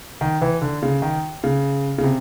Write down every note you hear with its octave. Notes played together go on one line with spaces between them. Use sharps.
D#3
E3
D3
C#3
D#3
C#3
C#3
C3